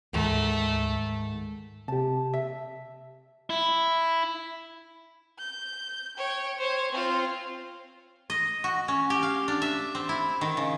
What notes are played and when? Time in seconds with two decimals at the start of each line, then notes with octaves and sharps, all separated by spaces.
0.13 D2 G#2 D#3 A3 A#5
1.88 C3 G4 A5
2.34 E5
3.50 E4
5.39 G6
6.17 C#5 G5
6.58 C5 C#5
6.92 C4 F4
8.30 D#5
8.64 F#4
8.88 C#4
9.10 G4
9.23 F5
9.48 D4
9.62 E5
9.95 C4
10.09 E4
10.41 D#3
10.57 C#3